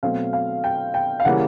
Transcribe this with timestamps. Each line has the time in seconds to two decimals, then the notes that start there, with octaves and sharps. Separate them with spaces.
0.03 B2 F#3 A3 C4 F5
0.33 F5
0.64 G5
0.94 G5
1.20 F5
1.25 C#3 E3 G3 A#3 C#4 F#5